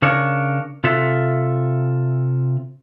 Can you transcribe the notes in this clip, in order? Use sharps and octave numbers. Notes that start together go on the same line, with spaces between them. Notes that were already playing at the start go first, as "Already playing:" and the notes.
C#3 D4 A#4 C#5
C3 F4 A4 E5